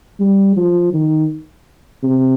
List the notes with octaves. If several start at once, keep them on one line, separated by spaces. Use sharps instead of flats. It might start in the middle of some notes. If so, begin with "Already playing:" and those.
G3
F3
D#3
C3